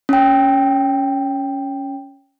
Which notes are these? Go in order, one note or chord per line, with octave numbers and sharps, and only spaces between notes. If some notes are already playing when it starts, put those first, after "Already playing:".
C#4 G5